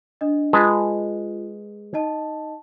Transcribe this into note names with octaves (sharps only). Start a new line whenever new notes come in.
D4 D#5
G#3 F4 B4 A5
D#4 D#5 A5